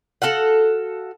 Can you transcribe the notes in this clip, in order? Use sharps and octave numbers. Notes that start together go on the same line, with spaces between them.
F#4 A4 F5 F#5